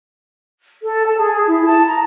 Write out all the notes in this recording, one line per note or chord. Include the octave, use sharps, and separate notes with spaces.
A4
A5
G#4
E4
A5
A#5